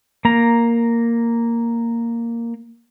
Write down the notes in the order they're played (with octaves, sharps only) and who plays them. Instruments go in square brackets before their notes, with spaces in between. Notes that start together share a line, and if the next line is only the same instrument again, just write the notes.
[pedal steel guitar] A#3 A#5